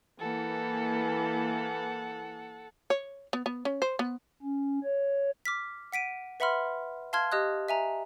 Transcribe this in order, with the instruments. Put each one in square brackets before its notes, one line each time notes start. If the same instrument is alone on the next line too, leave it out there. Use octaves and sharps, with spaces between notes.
[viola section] E3 A#3 [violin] A4 F#5
[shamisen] C#5
B3
B3
C#4
C5
B3
[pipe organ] C#4
C#5
[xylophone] D6 F6 B6
F#5 B6 D7 D#7
B4 E5 F#5 B5 C6 F6
F5 A5 C6 F6 G#6
G4 D#5 D#6 F#6
E5 G#5 A#5